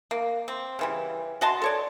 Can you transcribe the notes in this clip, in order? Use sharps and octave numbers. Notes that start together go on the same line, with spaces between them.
A#3
C4
C#3 E3 G3
F#4 D#5 A5 C6
A4 C#5 D5